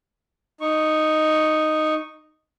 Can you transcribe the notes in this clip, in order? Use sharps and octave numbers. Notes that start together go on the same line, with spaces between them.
D#4 C#6